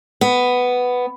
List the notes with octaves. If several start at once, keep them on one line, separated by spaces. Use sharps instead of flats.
B3